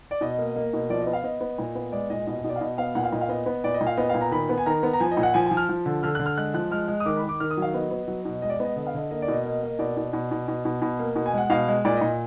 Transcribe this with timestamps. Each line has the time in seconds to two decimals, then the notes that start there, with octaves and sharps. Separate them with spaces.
0.11 D5
0.21 B2 D#5
0.38 A#3
0.56 A#3
0.73 B2
0.90 F3 D5
1.01 D#5
1.07 B3
1.13 F5
1.24 B3 D#5
1.41 B3
1.58 A#2
1.75 B3
1.92 G#3 D5
2.10 A#2 D#5
2.27 B2 D#5
2.39 D#5
2.44 B2
2.49 D5
2.56 F5
2.61 B2 D#5
2.78 B3 F5
2.95 A#2 F#5
3.03 F5
3.12 A#2 D#5
3.21 F5
3.29 B3 D#5
3.46 B3
3.64 A#2 D5
3.74 D#5
3.81 A#2
3.87 F5
3.97 B3 D#5
4.09 A#2 F5
4.21 A#5
4.31 D#3 B5
4.49 B3
4.58 G#5
4.66 D#3 A#5
4.83 B3
4.93 A#5
5.00 F3 G#5
5.11 D#5
5.17 A#2
5.23 F#5
5.34 F3 G#5
5.46 F3 G#5
5.57 F6
5.69 F3
5.86 D3
6.03 D3 F6
6.15 D3 F#6
6.26 F6
6.37 G#3 F#6
6.54 F3 F#6
6.71 G#3 F6
6.88 G#3
7.00 D#6
7.06 D#3 D6
7.17 B5
7.23 D#3
7.29 D6
7.40 D#3 F6
7.51 D#6
7.57 F#3 F5
7.74 B3 D#5
7.91 B3
8.08 F#3
8.25 B2
8.42 G#3 D#5
8.50 D5
8.54 D#5
8.60 B3
8.65 D#5
8.76 D3 D#5
8.87 F5
8.94 D3 D#5
9.11 A#3 D#5
9.22 D5
9.28 B2
9.34 D#5
9.45 A#3
9.63 A#3
9.79 B2 D5
9.97 B2
10.13 B2
10.31 B2
10.48 B2
10.65 B2
10.82 B2
11.00 A#3
11.16 B2
11.26 G#5
11.34 G#3 F#5
11.50 B2 F5
11.68 G#3
11.85 A#2 D5
11.97 A#2 D#5